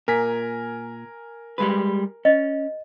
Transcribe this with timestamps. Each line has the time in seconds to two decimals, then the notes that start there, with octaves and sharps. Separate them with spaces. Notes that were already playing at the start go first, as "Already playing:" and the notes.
0.08 A#2 A#4 G#5 B6
1.58 G3 G#3 B4
2.25 C#4 D#5